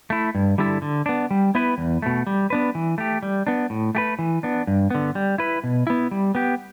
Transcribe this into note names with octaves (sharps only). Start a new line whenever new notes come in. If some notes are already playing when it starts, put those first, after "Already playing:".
A3 E4
G2
D3 G3 E4 A4
D3
B3 D4
G3
B3 E4 B4
E2
B2 A3
G3
B3 D4 B4
E3
A3 G4
G3
B3 D4
A2
A3 G4 B4
E3
B3 D4
G2
D3 B3
G3
E4 B4
B2
B3 E4
G3
B3 G4